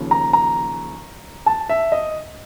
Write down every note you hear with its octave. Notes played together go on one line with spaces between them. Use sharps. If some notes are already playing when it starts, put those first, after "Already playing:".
Already playing: D#2 C#3 F3
A#5
A#5
A5
E5
D#5